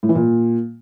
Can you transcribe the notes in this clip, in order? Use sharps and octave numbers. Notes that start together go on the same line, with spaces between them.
A2
E3
A#2